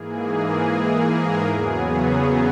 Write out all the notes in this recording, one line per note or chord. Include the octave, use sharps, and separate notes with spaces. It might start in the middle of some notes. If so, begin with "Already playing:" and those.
Already playing: G#2 E3 A#3 G#4
A#4
E2 C#3 F#3 B3 G#4